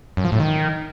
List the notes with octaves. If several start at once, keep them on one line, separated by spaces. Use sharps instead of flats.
F#2
F3
A2
D#3